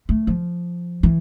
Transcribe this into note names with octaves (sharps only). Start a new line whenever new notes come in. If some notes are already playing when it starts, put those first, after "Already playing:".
A3
F3
E3